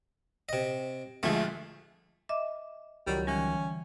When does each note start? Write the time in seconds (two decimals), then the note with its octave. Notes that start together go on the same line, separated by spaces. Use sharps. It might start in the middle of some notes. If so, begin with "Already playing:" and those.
0.49 C3 D#5
1.23 D2 F3 G#3 A3
2.29 D#5 E5 D6
3.07 C#2 D#3 F#3 G3
3.27 D3 E3 G3 C#4